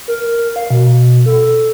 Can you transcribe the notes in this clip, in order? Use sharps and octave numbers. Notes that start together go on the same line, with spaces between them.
A#4
F5
B2
A4